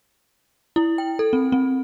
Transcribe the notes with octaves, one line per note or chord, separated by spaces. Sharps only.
E4
G5
A4
C4
C4